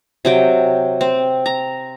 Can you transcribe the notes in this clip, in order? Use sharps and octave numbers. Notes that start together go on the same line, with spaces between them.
C3 F#3 G5
C4
A#5